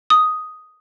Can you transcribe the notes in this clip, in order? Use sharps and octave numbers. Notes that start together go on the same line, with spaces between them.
D#6